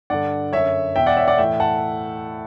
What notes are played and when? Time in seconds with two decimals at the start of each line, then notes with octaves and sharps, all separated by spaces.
0.10 G2 D3 D5 F#5
0.53 F#2 D3 C#5 E5
0.96 E2 B2 E5 G5
1.06 D5 F#5
1.17 C#5 E5
1.28 D5 F#5
1.38 A2 E3 E5 G5
1.60 F#5 A5